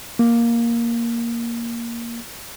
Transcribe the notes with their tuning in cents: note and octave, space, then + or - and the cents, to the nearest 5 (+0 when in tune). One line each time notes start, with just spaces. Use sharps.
A#3 +5